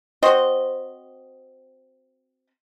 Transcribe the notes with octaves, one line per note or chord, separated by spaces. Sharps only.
C4 F#4 C5 D#5